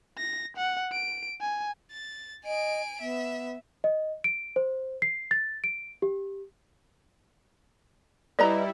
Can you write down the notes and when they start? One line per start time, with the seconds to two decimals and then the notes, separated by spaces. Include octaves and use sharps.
0.18 A#6
0.57 F#5
0.92 D7
1.41 G#5
1.91 A6
2.45 D#5 G#5 D7
3.01 B3 E5
3.84 D#5
4.24 D7
4.56 C5
5.02 C7
5.31 A6
5.64 D7
6.02 G4
8.39 G3 E4 B4 D5 D#5 A#5